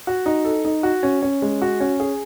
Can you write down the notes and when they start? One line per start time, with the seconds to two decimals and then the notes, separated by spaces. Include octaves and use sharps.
0.07 F#4
0.26 D#4
0.45 A4
0.65 D#4
0.83 F#4
1.03 C#4
1.22 C#4
1.42 G#3
1.62 F#4
1.80 C#4
2.00 G#4